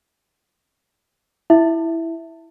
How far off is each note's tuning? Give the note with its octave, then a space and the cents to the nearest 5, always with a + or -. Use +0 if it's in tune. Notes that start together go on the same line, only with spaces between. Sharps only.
E4 +0 E5 +0